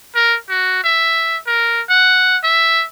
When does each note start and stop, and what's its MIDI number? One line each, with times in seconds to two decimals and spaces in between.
0.15 0.36 70
0.49 0.79 66
0.83 1.38 76
1.47 1.81 70
1.89 2.37 78
2.43 2.85 76